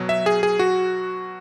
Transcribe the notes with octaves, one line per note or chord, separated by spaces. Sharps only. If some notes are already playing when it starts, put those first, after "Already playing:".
Already playing: B2 F#3
E5
G#4
G#4
F#4